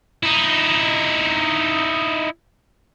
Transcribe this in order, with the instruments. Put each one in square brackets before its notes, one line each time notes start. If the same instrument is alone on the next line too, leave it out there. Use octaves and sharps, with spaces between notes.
[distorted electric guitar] D#4 E4